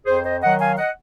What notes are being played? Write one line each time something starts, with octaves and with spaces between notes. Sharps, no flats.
F2 G#4 C5
C5 D#5
D#3 F#3 D#5 F#5
F5 G#5
D#5 F#5